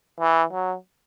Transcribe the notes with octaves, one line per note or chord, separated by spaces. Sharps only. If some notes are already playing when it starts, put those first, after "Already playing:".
E3
F#3